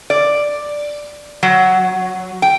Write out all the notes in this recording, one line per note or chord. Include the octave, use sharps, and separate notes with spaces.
D5
F#3
G5